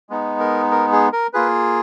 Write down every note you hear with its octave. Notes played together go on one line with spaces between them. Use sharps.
G#3 B3 D#4
A#4
A#4
G#4
A#4
A#3 F4 G#4 B4